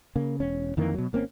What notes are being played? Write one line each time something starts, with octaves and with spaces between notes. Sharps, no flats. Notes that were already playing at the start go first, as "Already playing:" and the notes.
C#3 A#3
E1 C#4
F2 D#3 E3 A#3
B2 F#3
G#1 A#3 C4 C#4